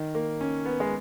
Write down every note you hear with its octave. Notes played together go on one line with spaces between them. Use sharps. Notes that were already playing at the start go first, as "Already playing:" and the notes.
Already playing: D#3
A#3
C#4
B3
G#3